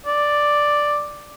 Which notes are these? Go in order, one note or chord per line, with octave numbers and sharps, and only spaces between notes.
D5